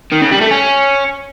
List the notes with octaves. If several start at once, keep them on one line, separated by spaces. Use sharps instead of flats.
D#3
C#3
G3
A3
C#4